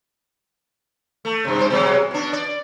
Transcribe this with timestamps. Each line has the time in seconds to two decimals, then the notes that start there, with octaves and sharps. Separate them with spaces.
1.25 A3
1.45 G2 C3
1.59 G2 C5
1.70 B2 F#3 G#3
2.11 B2 D4
2.33 D5